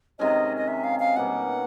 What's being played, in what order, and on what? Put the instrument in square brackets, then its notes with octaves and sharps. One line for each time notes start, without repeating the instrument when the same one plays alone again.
[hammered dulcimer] C3 D#3 G#3 C#4 [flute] D#5
[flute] D#5
E5
F5
F5
[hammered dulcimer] B2 G3 A#3 [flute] F#5